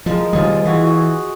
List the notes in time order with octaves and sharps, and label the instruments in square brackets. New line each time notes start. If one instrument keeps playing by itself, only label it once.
[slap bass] F3 [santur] G#3 A#4
[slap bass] D#3 G3 [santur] F4 G#4 D#5
[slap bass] E3 [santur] F4 F#4 G#4
[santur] F#4 D#5